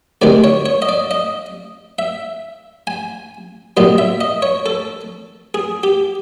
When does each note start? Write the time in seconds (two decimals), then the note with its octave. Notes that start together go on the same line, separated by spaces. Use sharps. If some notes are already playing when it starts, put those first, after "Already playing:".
0.21 D2 C3 D#3 G#3 D5
0.44 C#5
0.66 C#5
0.82 D#5
0.89 D5
1.11 D#5
1.99 E5
2.87 G#5
3.77 C2 A#2 F#3 D#5
3.98 E5
4.21 D#5
4.42 C#5
4.66 A4
5.54 G#4
5.83 G4